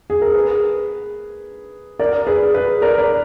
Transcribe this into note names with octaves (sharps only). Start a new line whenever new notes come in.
G#4
A#4
G#4 B4
A#4 D5
G#4 B4
G#4 B4
A#4 D5
D5